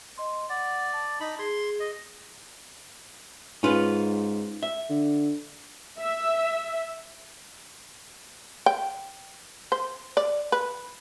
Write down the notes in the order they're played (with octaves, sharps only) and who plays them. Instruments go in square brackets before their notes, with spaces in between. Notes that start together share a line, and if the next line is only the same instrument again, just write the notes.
[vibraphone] D#5 C6
[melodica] D5 [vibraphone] F#5
[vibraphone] A5
[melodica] D#4 B5
[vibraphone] G#4 [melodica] C6
[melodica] D#5
[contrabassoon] G#2 [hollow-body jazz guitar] C#4 F4 B4
[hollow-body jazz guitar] E5
[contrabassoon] D3
[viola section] E5
[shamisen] G5
C5
D5
B4